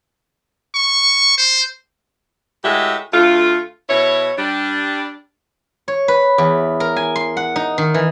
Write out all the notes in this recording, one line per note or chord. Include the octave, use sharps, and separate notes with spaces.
C#6
C5
A2 G#3 F#4 G4 E5
D2 A3 F4
B2 E4 C#5
G3 D4
C#5
B4
E2
A#4
G#5
C6
F#5
D#4
D#3
E3